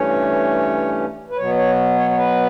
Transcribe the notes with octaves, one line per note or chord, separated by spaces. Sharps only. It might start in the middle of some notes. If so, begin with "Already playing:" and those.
Already playing: G2 E3 A3 C#4 C#5
B4
B2 F#3 B3 C#5
C#5
C#5
C#5
B4